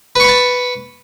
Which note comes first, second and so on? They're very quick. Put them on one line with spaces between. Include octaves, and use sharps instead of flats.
B4 C#6 B5 A5